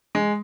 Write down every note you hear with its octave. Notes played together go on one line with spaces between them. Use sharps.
G#3